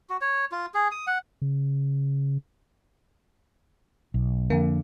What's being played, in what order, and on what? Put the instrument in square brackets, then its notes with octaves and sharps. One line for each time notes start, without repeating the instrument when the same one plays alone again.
[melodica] F#4
C#5
F4
G#4
D#6
F#5
[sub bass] C#3
[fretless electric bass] B1
[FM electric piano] F2 A#3 [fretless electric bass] D3